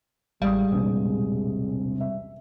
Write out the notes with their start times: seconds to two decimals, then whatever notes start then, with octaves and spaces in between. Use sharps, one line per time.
0.42 A1 G3 G#3 F5 D#6
0.72 E1 A#1 C3
2.01 E5